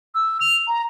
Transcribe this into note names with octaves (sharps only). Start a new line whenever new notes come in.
E6
F7
A#5